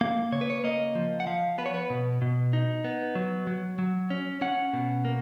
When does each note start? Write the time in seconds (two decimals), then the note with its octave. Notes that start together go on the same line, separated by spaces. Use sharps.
0.01 A#3 F5
0.32 C#3 C#5
0.41 B4
0.50 C#5
0.64 A#3 D#5
0.95 F3
1.20 F#5
1.27 F3 F5
1.58 B3 B4
1.66 C#5
1.74 B4
1.90 B2
2.22 B2
2.53 D#4
2.84 B3
3.15 F#3
3.47 F#3
3.79 F#3
4.10 C#4
4.41 C#4 F#5
4.73 B2
5.05 A#3